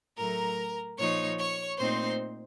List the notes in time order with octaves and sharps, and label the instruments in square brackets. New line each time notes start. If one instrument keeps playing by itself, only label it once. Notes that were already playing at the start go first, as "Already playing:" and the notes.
[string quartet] A2 F#3 A3 A#4 A#5
A#2 F3 A#3 D#4 C#5 C#6
C#5 C#6
A#2 A3 C4 D#4 C5 C6